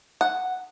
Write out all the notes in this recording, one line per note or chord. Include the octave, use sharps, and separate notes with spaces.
F#5